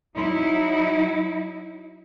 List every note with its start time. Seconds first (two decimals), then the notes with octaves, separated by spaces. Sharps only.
0.15 F#3 D#4 E4